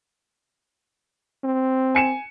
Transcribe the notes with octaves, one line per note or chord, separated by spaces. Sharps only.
C4
G#5 C#7 E7